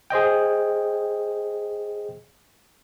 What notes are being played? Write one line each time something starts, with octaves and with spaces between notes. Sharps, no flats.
G#4 C5 D#5 G5